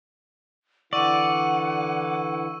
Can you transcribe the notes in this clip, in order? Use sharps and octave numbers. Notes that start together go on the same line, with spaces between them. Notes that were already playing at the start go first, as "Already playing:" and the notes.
D3 E3 E4 D5 F#5 C#6 E6 D#7